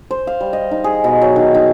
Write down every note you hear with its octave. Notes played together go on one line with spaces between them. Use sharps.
C5
F5
G3
D#5
D#4
G#4
B2
F#3
D#3
D#4